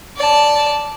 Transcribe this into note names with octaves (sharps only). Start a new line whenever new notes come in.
D5 A5